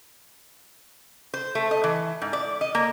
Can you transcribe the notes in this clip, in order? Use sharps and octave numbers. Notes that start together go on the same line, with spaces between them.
C5
A3
D#5
E3
G#2
D5
D#5
A#3